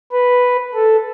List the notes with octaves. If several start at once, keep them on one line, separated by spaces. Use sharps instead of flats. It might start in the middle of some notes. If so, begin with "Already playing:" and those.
B4
A4